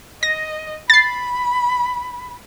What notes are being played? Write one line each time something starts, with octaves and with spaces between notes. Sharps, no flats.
D#5 A#6
B5 A6 C7